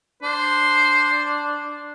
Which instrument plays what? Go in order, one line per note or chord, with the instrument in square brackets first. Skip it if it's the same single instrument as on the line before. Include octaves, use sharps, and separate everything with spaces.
[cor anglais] D4 [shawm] C5